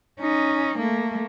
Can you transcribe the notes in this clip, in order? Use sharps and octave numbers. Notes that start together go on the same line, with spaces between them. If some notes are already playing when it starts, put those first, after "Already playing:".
C#4 D#4
A3 A#3